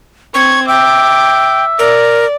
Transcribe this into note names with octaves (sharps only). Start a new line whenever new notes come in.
C4 C#6 G#6
E5 G5 D6
A#4 D5